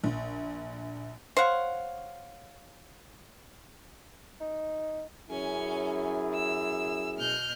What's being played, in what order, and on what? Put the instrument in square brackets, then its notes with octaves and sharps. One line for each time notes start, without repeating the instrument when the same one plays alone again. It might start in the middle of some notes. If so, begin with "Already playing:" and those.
[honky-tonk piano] A#1
[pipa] C5 F#5 [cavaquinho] C#5 F5 C#6
[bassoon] D#4
[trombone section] F#2 E4 G#4 [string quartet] C#4 G#5
[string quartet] E6
B2 F6 G6